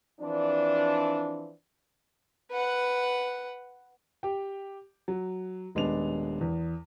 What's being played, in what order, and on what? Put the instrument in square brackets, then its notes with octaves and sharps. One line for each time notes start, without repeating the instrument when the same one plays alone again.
[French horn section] E3 F3 C4 D4
[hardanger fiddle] B4 F#5
[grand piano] G4 G5
F#3
D#1 G#3 B3 D4 F7
E2